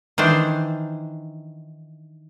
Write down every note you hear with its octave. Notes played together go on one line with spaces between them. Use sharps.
D#3 E3 D4 C5